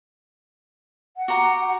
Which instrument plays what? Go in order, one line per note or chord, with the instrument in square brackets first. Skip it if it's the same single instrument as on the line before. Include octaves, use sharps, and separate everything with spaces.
[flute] F#5
[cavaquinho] F#4 G4 A#5
[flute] F#5